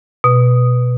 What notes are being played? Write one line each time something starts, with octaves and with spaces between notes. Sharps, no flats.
B2